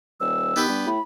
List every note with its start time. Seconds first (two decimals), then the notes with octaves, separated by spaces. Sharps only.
0.20 D#1 E6
0.56 D#3 B3 G4 B4
0.69 G2
0.87 A2 B5